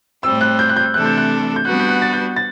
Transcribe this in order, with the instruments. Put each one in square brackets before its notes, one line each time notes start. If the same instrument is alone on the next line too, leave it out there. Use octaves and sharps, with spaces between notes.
[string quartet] A2 G3 C4 [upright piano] E6
[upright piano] F#6
G6
F#6
G6
[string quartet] C3 E3 A3 D4 A4 [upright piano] F#6
[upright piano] G6
F#6
G6
[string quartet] G3 B3 D4 F#4 B4 [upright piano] F#6
[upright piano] G6
F#6
A6
G6
A6